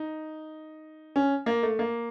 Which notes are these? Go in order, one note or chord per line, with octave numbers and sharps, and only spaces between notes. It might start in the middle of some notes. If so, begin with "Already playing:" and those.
Already playing: D#4
C#4
A#3
A3
A#3